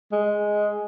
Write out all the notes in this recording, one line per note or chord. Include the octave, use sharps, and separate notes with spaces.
G#3